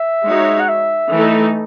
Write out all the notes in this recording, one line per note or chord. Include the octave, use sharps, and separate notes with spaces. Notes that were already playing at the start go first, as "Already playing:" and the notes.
Already playing: E5
G#3 D#4 F#4 C#5
F#5
E5
E3 A3 D#4 A4